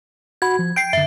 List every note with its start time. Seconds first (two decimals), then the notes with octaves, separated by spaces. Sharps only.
0.42 F#4 F#5 B5 G#6
0.59 F3
0.76 G5 G6 C7 D7
0.93 F#2 D3 E5